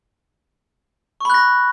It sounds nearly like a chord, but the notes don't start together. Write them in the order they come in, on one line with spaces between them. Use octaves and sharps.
C#6 B5 F#6 A#6